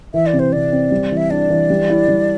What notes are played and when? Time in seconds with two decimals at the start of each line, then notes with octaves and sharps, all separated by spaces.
0.14 E3 E5
0.27 D5
0.33 C3
0.39 C5
0.53 C3 D5
0.72 C4
0.91 G3
1.12 E3
1.17 E5
1.30 D4 D5
1.50 E3
1.70 G3
1.89 E4
2.08 G3